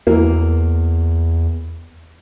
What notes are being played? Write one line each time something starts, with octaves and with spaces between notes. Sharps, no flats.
E2 E3 A#3